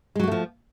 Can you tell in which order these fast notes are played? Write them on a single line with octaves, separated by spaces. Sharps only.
G#3 F#3 F#4 A3 F3